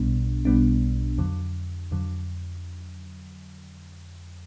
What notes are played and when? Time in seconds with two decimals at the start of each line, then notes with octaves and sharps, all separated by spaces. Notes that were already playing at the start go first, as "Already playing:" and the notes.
Already playing: B1 B2 G3 B3 D4
0.45 B1 B2 G3 B3 D4
1.18 F2 D3 F#3
1.91 F2 D3 F#3